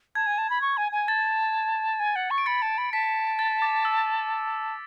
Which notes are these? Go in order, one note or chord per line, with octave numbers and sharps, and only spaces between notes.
A5 G#6
G#5
A5
B5
C#6
G#5
G#5
A5 A6
G#5
F#5
C#6
D7
B5 A6 C#7
A5
B5
A5 B6
A6
D6
E6